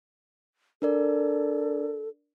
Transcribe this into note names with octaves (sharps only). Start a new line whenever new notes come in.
D4 A4 A#4 D5